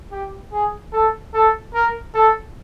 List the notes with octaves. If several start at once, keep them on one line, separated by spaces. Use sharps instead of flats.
G4
G#4
A4
A4
A#4
A4